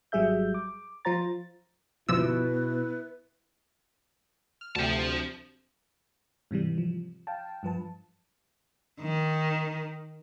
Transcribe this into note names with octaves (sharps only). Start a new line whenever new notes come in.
G#1 F#3 G3 G#4 E5 G6
D6
F3 F4 C5 A#5 A6
G1 B2 F3 E4 B4 E6
F6
D2 C3 C5 A5
G#2 C3 E3 G3
F3
F5 G5 A5
G2 F3 B4 A5
D#3